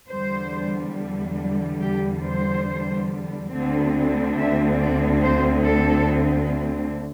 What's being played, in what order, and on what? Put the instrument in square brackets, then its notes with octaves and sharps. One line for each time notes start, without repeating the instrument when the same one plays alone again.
[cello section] E2 D3 G3 C5
G4
C5
D2 D3 C4
E5
D5
C5
A4